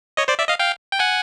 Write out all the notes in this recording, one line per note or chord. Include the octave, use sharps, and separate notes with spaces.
C#5 D#5
C5 D5
D5 E5
D#5 F5
F5 G5
G5
F#5 G#5